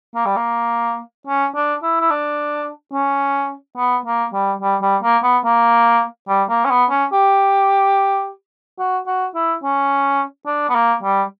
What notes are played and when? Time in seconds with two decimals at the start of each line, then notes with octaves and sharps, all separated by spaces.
0.15 A#3
0.25 G3
0.36 A#3
1.27 C#4
1.55 D4
1.82 E4
2.01 E4
2.10 D4
2.93 C#4
3.77 B3
4.05 A#3
4.33 G3
4.62 G3
4.82 G3
5.03 A#3
5.23 B3
5.45 A#3
6.28 G3
6.49 A#3
6.65 C#4
6.70 B3
6.90 C#4
7.13 G4
8.79 F#4
9.07 F#4
9.35 E4
9.63 C#4
10.46 D4
10.69 B3
10.75 A#3
11.03 G3